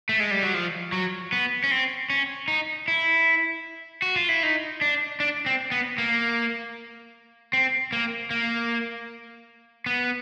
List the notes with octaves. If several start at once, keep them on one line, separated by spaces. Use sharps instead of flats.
A3
G#3
G3
F#3
F3
F#3
B3
C#4
C4
C#4
D#4
E4
F#4
F4
E4
D#4
D4
D4
C4
B3
A#3
C4
A#3
A#3
B3